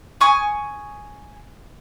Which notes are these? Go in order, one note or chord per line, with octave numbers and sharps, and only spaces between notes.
G#5 C#6 D#6